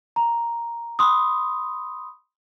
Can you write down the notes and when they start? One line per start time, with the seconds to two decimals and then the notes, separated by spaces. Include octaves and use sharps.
0.16 A#5
0.99 B5 C6 D#6